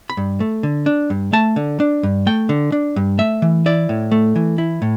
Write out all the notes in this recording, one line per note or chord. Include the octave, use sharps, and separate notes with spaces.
B5
G2
A3
D3
D4
G2
A3 A5
D3
D4
G2
A3 G5
D3
D4
G2
A3 E5
E3
E4 D5
A2
A3
E3
E4
A2